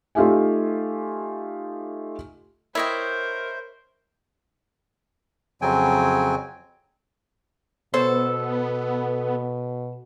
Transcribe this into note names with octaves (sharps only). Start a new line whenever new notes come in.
A3 D#4 F4 G4 E5 G#5
E4 A#4 C5 C#5 D#5 G5
F2 C#3 F#3 C4 G5 G#5
B2 B3 A4 C5 C#5 C6